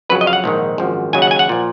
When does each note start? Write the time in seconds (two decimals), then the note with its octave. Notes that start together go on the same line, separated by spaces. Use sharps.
0.09 F2 C#3 F#3 B4
0.21 D#5
0.27 F5
0.33 F#5
0.44 A#1 G#2 D#3
0.78 G#1 F#2 F3
1.13 D#2 C#3 F#3 G#5
1.22 F#5
1.31 G#5
1.39 F#5
1.49 A#2 F3